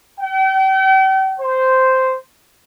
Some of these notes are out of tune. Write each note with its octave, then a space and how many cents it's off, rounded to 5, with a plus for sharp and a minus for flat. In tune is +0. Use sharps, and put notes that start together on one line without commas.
G5 -40
C5 -5